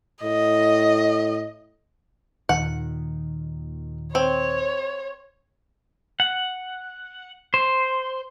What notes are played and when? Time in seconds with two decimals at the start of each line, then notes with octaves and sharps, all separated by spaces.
0.23 A2 D#5
2.49 D#2 A#2 D#3 F#5
4.15 C4 C#5
6.20 F#5
7.54 C5